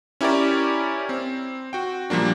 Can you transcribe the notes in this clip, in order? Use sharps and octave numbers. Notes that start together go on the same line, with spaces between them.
C#4 E4 G4 A#4 C#5 D5
C4
F#4 G5
A#2 F3 G3 A#3 D4